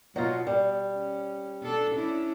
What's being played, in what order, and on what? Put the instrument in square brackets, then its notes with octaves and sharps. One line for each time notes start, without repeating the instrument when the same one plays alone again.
[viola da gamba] B2 [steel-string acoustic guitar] F#3 D#4 F4
[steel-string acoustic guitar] G3
[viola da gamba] C#4
B2 D4 A4
C#4 D4 E4